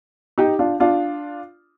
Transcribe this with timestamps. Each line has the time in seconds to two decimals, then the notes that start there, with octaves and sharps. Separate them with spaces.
0.38 D#4 G4
0.59 D4 F4
0.80 D4 F4